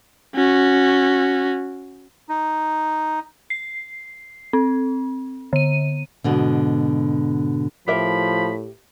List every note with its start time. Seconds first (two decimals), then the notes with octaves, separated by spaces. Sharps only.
0.35 C#4 F#4
2.29 D#4
3.50 C7
4.53 C4
5.53 D3 D#7
6.24 G#2 B2 D3
7.88 A2 F3 G4 A#4 E5 B5